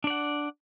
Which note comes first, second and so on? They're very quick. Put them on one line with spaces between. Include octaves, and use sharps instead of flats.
D4 D5 F#5